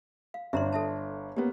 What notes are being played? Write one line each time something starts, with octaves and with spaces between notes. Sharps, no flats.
F5
G1 D4 E5 A#5 C6
A4 E5 A5
A#3 B3 G4 C#5